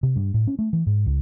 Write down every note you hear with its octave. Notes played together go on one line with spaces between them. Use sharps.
C3
G2
A2
C#4
A3
E3
G#2
C#2